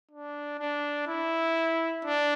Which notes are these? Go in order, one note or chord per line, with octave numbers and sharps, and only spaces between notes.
D4
D4
E4
D4